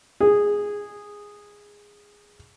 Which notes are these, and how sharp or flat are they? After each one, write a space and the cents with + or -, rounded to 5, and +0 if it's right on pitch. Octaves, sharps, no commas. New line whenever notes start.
G#4 -10